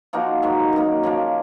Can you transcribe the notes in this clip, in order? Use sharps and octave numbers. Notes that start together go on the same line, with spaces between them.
F3 A#3 D#4 F#4
G#2 D#3 F#3
F#2 D#3 A#3
C#3 F3 A#3